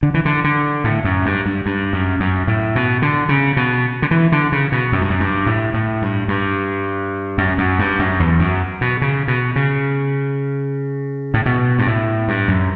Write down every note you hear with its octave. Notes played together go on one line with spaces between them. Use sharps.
D3
E3
D3
D3
A2
F#2
G2
G2
G2
F#2
F#2
A2
B2
D3
C#3
B2
D3
E3
D3
C#3
B2
F#2
G2
F#2
G2
A2
A2
G2
G2
F#2
F#2
G2
F#2
E2
F#2
B2
C#3
B2
C#3
A2
B2
G2
A2
G2
F#2